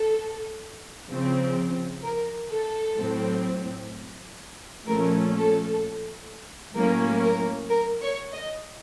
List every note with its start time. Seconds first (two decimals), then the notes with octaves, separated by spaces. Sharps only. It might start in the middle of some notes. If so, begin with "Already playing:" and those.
Already playing: A4
1.10 C#3 F3 C4
2.04 A#4
2.52 A4
2.98 A2 F#3 C4
4.87 A#2 F3 A3 C#4 A#4
5.35 A4
6.75 A2 F#3 A#3 C#4 A#4
7.23 A#4
7.69 A#4
8.02 C#5
8.33 D#5